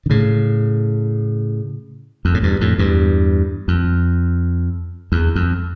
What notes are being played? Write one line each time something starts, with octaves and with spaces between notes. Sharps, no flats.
D3
A2 C#3
F2
A2
E2 G2
F2 A2
E2 G2
F2
E2
F2